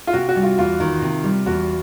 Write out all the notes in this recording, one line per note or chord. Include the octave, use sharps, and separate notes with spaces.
F4
C3 F#4
F#4
G3
F4
E2 F4
D#3
C3
G3
E2 F#4